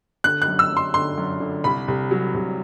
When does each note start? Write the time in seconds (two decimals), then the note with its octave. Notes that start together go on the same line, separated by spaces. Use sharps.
0.24 D3 F#6
0.42 F#6
0.48 F#2
0.59 E6
0.71 F#2
0.77 C6
0.94 D3 C6
1.18 F#2
1.40 D3
1.64 C2 B5
1.88 C2
2.11 F#3
2.34 C2